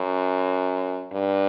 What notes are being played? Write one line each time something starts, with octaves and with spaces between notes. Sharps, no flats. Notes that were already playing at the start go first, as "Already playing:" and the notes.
Already playing: F#2
G2